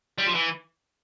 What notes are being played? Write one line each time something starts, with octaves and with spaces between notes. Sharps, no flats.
G3
F3
E3